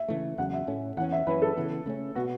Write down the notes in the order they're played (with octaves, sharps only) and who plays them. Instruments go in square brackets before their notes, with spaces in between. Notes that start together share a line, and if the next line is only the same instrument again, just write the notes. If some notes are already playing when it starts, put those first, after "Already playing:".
Already playing: [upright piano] E5
[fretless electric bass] C#3 E3 A3
[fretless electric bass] E2 C#3 F#3 [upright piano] F#5
[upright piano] E5
[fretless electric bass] A2 A3 C#4
[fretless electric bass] E2 [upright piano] F#5
[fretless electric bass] E3 C#4
[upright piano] E5
[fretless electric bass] F#2 E3 C#4 [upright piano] B4
[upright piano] A4
[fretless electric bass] C#3 E3 B3
C#3 A3 C#4
[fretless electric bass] B2 B3 [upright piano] F#4